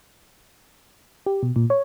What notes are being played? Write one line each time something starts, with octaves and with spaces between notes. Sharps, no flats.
G4
B2
A#2
C#5